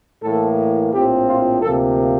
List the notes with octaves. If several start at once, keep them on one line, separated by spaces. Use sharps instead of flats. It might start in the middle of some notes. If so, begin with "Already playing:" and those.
A2 E3 A#3 A4
A#1 A2 F3 C4 G4
F4
D2 C3 F3 A#3 A4